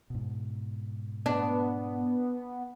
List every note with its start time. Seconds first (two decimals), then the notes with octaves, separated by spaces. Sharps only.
0.10 G#2 B2
1.26 B3 D4